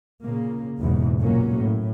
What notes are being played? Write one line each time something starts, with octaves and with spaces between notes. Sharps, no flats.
A#2 C#3 A#3
F#1 B1 E2 G#2 B2
B1 A#2 F#3 A#3 C#4
A2